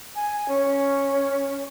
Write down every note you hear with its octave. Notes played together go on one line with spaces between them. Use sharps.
G#5
C#4